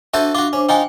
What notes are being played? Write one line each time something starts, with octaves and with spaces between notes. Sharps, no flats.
D4 F#4 A4 C5 E5
F4 F#4 D6
C#4 D4 C5
D#4 F4 G5 G#5